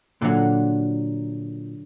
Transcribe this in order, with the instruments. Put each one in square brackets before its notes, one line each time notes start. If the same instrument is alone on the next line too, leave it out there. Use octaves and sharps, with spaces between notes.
[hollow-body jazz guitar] A#2 [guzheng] D3 F#3